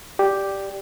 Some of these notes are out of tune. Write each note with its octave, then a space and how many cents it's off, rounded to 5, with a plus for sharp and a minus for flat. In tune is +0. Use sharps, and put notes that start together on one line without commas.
G4 +0 D5 +0